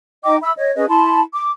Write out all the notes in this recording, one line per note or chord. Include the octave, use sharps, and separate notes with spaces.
D#4 D#5 G5 D6
E5 B5 E6
C#5 D#5
C#4 G#4 B4 D#5
E4 A5 B5 C6
D6